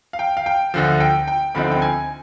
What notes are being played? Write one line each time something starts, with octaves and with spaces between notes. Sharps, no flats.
F5
G5
F5
G5
D2 D3 F3
G5
G5
D2 D3 F3 C4 D#4 B5
G5
G#5